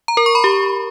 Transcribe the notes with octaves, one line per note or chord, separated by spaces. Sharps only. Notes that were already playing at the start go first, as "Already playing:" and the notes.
A#5
A#4
C#6
B5
G4